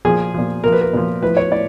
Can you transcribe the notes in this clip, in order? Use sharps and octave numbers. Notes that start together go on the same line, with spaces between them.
A#2 F3 G#4
A#2 F3
A#2 F3 A#4
B4
A#4
A#2 F3
A2 F3 B4
C#5
A2 D5